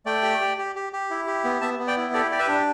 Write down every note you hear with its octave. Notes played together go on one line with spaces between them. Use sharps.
A3 D5 G5
G4
G4
G4
G4
G4
E4
G4
B3
B3 E5 A5
B3
D5 G5
E4
G4 A4 D5
G4 D5
B4 E5
D4